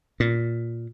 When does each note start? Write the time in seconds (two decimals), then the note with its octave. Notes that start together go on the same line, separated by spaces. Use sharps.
0.20 A#2